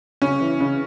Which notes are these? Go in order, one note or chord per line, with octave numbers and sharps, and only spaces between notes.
C#3 C#4
E3
C#3